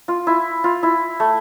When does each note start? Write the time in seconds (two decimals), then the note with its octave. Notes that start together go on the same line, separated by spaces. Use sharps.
0.08 F4
0.27 E4
0.64 F4
0.83 E4
1.20 A3